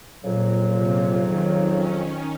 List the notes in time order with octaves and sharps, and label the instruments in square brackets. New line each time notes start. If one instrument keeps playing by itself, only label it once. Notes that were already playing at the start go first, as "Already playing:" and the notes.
[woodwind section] F2 C#3 F#3 [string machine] A#2
[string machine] C3
D#3
C#4